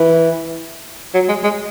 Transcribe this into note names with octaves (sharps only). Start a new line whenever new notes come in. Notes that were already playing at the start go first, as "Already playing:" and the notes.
Already playing: E3
F#3
G#3
G#3